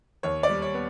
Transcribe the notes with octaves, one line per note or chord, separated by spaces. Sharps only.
D#2 C#5
D5
G3
C#5
B3